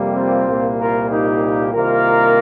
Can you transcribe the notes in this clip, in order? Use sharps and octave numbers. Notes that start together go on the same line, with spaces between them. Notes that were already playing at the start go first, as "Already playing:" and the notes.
Already playing: F2 C3 G3 A#3
C4 F4
C2 A#2 A#3
F4 A#4
D#4 G4
C2 C3 D#3 A#3 F4 A#4